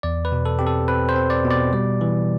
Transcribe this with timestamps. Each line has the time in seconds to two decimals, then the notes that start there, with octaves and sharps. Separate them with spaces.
0.03 E2 D5
0.25 B4
0.32 B2
0.45 A4
0.59 C4 G4
0.67 A4
0.88 C4 B4
1.09 C5
1.16 C4
1.30 D5
1.45 B2
1.51 D5
1.73 G3
2.01 E3